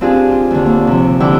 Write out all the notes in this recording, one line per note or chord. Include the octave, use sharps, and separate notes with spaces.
C4 D4 F4 G4 G#4
F4
D#2 D3
A#3
C3 F3
D3 C4 E4 G4 G5 D6